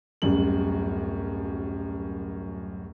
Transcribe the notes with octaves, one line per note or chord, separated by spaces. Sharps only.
D1 F#2 G3 F#7